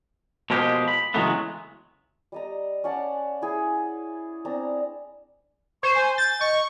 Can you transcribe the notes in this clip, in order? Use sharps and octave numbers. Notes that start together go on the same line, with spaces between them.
B2 F3 G#3 A#3 G4
B5
C#3 E3 F#3 G#3 A3 B3
G3 D#5 A#5
C#4 D5 F#5 A5
E4 G#4
C4 D4 A#5
C5 C#6
G#5
G6 A6
D#5 C#6